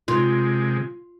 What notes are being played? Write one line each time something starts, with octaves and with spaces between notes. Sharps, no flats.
C3 G#3 F4